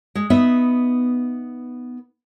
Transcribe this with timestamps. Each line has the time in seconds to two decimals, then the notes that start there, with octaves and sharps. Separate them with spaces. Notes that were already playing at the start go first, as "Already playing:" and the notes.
0.15 G#3
0.30 B3 D#4 B4 E5